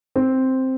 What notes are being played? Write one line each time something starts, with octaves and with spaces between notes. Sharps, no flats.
C4